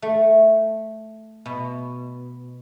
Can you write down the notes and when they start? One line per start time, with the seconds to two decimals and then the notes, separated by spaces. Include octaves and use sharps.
0.02 A3
1.46 B2